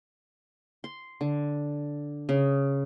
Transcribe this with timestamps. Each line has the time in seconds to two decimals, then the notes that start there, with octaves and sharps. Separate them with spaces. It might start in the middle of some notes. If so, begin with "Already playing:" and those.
0.84 C6
1.21 D3
2.29 C#3